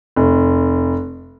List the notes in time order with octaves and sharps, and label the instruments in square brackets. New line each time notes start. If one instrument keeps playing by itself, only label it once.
[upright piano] F1